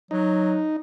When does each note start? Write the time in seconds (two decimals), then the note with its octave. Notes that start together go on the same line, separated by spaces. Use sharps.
0.11 F#3 D#4